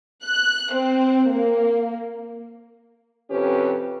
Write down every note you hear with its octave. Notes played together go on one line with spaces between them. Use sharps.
F#6
C4
A#3
F2 C3 C#4 G4 B4